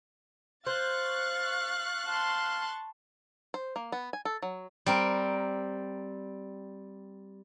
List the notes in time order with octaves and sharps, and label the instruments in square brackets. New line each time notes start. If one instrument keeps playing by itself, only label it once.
[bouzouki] C5 [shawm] F5 [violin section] C#6 F#6 A6
[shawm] F5 [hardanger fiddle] A5 C6
[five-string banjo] C5
A#3
B3
G#5
A4
F#3
[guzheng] G3 C4 A#4